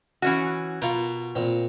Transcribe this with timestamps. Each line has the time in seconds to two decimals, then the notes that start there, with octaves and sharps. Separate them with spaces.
0.22 E3 C#4 F#4
0.82 B2 F4 A#4
1.35 A#2 C4